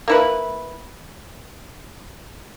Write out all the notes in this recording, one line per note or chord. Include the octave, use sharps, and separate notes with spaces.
A#3 E4 B4